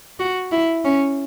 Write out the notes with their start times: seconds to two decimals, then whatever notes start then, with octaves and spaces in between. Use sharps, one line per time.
0.20 F#4
0.52 E4
0.85 C#4